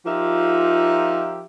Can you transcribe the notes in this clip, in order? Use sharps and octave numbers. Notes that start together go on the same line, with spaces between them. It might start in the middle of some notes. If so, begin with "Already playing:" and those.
F3 D#4 F4 G4 A#4 E5